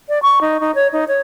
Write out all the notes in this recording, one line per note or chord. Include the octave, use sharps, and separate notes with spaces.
D5
C#6
D#4
D#4
C#5
D#4
C#5